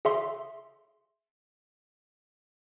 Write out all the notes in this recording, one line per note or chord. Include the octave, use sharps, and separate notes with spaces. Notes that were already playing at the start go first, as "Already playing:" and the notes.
G#4 E5 C6